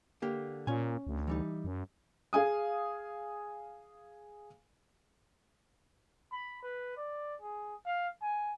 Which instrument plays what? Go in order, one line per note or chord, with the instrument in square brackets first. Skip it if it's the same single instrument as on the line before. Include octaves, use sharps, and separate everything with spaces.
[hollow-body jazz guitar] D3 A#3 G4
[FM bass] A#2 [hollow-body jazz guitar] C#4 G#5
[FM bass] D2
[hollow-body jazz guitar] E3 G3 D#4
[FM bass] F#2
[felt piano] G#4 F5 G#5 D#6
[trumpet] B5
B4
D5
G#4
F5
G#5